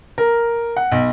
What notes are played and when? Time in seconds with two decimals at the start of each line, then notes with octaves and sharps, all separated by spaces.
0.18 A#4
0.76 F#5
0.92 B1